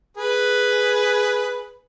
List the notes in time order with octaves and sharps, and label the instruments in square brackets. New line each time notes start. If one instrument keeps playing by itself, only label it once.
[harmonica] G#4 B4